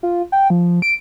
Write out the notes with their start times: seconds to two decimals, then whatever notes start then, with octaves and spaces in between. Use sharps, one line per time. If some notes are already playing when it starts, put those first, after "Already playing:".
0.03 F4
0.32 G5
0.50 F3
0.82 D7